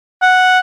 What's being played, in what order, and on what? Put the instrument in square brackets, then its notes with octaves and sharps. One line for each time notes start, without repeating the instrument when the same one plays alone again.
[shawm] F#5